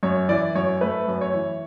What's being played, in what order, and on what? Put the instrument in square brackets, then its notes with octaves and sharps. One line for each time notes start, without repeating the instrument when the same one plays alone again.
[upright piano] F#2 C#5
E3 D5
F#2 C#5
A3 B4
F#2
C#5
E3